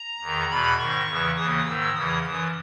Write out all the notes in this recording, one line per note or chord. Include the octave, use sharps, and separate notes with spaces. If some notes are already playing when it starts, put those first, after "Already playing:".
Already playing: A#5
E2 D#3
E2 B2 B5
G#2 D#3 C#6
E2 C#3 E3
D#2 C#3 E3 D#6
G#2 D#3 E6
E2 C#3 E3 D#6
F#2 E3